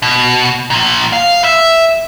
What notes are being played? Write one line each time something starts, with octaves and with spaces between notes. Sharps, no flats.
B2
A#2 F3
F5
E5